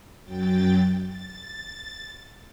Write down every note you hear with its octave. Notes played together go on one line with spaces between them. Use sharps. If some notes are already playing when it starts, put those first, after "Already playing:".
F#2 F#3 G5 A6
A6